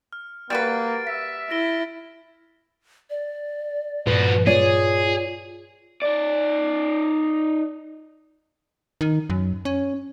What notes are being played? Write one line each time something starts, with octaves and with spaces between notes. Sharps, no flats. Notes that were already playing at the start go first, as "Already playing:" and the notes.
F6
G3 A#3 F#4 B4 A6 D7
E5 B6
E4 A#6 D7 G7
D5
G2 A#2 F3 F#4 B4
F4 G#4 C#5 D5
D#4 D5
D#3
F#2
C#4